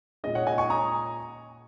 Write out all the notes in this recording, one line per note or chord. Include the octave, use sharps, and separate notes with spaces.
A#2 G#3 C#4 D#5
C#5 F#5
D#5 G#5
G#5 C#6
A#5 D#6